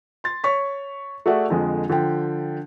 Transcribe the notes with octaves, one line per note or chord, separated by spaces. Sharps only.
C6 A6
C#5 C#6 B6
A3 F#4 G#4 D5 E5 F#5
F2 D3 F3 G#3
D3 F3 G5